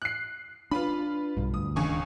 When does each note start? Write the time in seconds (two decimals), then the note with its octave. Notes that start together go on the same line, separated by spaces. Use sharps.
0.02 F#6 C7
0.71 D4 F4 B4 B5
1.37 B1 G2
1.54 D2 D#6
1.76 D1 C#2 D#3 D4 G#5 C#6